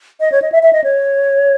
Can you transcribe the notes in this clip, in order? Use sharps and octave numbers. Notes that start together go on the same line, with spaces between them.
D#5
C#5
D#5
E5
E5
D#5
C#5